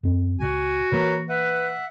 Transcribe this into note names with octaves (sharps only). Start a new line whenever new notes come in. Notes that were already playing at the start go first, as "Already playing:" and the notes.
F#2 C4
C#2 A#2 F#4 G#5
A#2 E3 A#3 A#4 B4 C#5
B4 E5 F#5